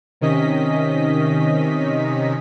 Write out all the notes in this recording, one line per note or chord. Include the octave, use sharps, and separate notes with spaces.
C3 D#3 C#4 D#5 B6